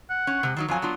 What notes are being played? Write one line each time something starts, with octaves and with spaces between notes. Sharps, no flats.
F#5
C#4
C3 G#3 G4
D#3 F#3 D#4
F2 F#3 F4 G#5
B3 D4 F4